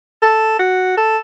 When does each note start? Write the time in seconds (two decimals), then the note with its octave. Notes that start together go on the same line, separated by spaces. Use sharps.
0.23 A4
0.60 F#4
0.98 A4